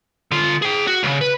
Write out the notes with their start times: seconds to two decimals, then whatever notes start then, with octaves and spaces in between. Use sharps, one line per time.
0.31 D3 F4
0.62 G#4 G5
0.87 F#4
1.03 C#2 C#3
1.21 B4